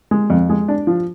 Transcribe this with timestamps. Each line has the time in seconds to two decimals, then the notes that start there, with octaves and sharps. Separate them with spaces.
0.11 G#3
0.30 F2
0.50 G#3
0.68 D4
0.87 F3